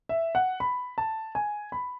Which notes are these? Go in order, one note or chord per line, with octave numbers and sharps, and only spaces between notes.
E5
F#5
B5
A5
G#5
B5